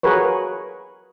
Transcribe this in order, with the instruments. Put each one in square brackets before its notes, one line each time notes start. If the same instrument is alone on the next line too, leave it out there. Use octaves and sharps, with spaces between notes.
[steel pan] F#4 G#4 A#4 B4 C#5